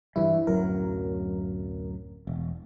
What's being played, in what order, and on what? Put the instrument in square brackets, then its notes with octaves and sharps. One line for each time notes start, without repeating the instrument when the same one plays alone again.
[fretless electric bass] G2 E3 G3 [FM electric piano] E4
[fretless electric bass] D1 F#2 F#3 [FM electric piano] A#4
[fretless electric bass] E1